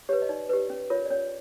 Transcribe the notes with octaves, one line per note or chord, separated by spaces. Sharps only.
G4 B4 C#5
D#5
D#4 D5
G4 B4
C#4
F4 A#4 C#5
D5
C#4 C#5